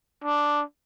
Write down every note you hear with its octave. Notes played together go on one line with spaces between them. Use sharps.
D4